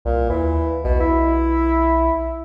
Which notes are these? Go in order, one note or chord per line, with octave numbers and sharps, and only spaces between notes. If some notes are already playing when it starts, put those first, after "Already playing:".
C2 A#2
D#2 E3
B1 B2
E4